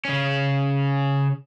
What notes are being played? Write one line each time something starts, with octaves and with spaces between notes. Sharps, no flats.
C#3 C#4